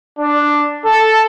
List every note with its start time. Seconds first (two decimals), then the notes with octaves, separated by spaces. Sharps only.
0.19 D4
0.84 A4